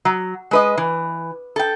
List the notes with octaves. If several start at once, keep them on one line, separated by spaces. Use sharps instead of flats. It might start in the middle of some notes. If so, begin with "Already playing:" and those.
F#3
G#3 B4 D#5
E3
A4 G5